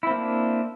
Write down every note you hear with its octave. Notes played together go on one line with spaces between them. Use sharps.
A#3 C4 D4 E4